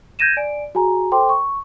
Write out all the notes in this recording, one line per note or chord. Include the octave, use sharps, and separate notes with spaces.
G6 G#6 A#6 D#7 E7
D5 G#5 D7
F#4 G#4 G#5 A#5
A4 C5 G5 C6 D6
C#6